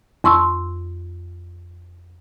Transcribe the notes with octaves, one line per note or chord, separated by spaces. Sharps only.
F2 C6 C#6 E6